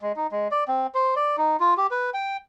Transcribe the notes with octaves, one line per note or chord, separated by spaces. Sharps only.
G#3
D#4
G#3
D5
C4
C5
D5
D#4
F4
G4
B4
G5